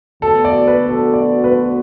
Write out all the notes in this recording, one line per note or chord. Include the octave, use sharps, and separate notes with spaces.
D2 D3 B3 F#4 A4
D5
B4
A4
D5
B4